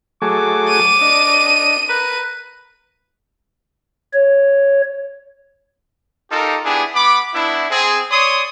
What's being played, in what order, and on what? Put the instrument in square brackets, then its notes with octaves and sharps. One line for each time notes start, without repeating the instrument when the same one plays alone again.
[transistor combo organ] F#3 A3 G#4 [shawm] D6
[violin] D#7
[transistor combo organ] D4 D#5
[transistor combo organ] A#4 [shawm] B4
[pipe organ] C#5
[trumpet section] D#4 F4 G4 A4 A#4
B3 D4 E4 G4 G#4
B3 B5 D6
B3 D4 E4
C4 G#4
C#5 D5 C6 D#6